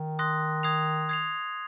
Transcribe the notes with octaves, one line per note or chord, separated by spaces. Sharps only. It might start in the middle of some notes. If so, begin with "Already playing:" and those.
Already playing: D#3
C6 D#6 F#6 A#6
D#6 G#6 C7 F7
D#6 G#6 C7 F7